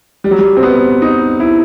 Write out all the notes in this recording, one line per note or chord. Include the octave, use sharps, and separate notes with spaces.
G3
F#3
G3
C4
B3
D#4
E4